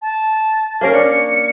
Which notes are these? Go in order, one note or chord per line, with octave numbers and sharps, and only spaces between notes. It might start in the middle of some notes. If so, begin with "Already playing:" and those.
A5
A#3 C#4 A#4 C7
D4 C#7